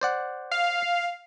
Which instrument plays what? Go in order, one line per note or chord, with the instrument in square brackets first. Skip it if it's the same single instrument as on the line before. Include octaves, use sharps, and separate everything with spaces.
[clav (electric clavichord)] C5 D5 F#5
[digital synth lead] F5